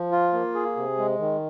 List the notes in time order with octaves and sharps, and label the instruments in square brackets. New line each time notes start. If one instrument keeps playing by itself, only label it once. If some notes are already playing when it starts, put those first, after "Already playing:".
Already playing: [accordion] F3
F4
A#3
G#4
C3
G#3
D#3